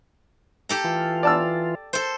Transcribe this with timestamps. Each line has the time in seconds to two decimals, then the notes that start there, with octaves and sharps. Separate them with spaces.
0.69 G4 A4 A#5
0.84 E3 F4
1.23 D5 A5 E6
1.93 A4 C5